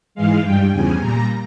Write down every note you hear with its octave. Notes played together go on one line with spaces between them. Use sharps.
G#2 E3 G#3 F5
G2 G3 G5
E2 C#3 F3 G#5
A#2 G3 A#5